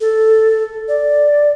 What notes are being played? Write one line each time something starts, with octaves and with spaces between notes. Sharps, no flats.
A4
D5